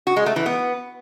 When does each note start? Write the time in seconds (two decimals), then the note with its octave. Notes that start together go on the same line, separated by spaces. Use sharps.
0.07 F#4
0.16 G#3
0.26 A3
0.36 E3
0.46 B3